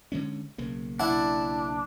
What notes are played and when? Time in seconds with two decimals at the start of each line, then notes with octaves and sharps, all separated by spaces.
0.12 D3 G#3 C#4
0.58 B1 C#3 A#3
1.00 D4 E4 F#5